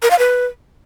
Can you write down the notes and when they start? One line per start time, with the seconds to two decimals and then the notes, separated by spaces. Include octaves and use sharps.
0.02 A#4
0.10 F5
0.19 B4